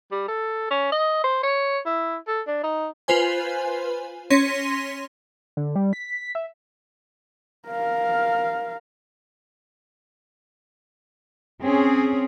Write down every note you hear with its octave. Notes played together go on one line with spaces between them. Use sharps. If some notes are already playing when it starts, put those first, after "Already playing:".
G3
A4
C#4
D#5
C5
C#5
E4
A4
D4
D#4
F4 B4 C5 G#5
C#4 C#5 C6 A#6 B6 D#7
D3
G3
B6
E5
A#4 F5
C4 C#4 G#4